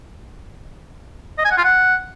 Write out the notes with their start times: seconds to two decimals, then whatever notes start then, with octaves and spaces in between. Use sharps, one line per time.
1.38 D#5
1.45 G#5
1.51 F#5
1.58 F4
1.64 F#5